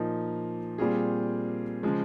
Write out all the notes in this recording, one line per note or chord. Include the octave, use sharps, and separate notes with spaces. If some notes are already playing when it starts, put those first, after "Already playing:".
Already playing: A#2 F3 A#3 D#4
A#2 G3 C4 F4 G#4
C#3 F3 G#3